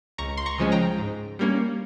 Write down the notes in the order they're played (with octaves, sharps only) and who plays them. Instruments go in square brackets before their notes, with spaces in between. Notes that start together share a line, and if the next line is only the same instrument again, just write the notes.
[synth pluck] C#2 A#5 C#6
C6
A#5 C#6
C#3 F3 G#3 C#4
G5 A#5
G#2
G3 A#3 C#4